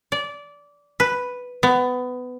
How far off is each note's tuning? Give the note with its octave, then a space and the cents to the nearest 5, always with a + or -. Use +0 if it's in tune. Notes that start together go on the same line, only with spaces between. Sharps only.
D5 -20
B4 +0
B3 +20